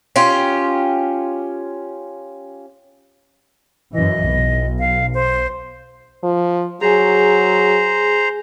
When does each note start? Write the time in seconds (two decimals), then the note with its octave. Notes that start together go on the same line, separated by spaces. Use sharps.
0.16 C#4 F4 G4
3.94 F#2 E3 D#5
4.26 B1
4.79 F5
5.14 C5
6.23 F3
6.81 F#3 G#4 C5 G#5 A#5